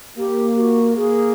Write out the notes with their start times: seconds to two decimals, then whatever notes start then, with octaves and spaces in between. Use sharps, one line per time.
0.18 A#3 G4
0.57 G4
0.60 F#4
0.96 A#3 G#4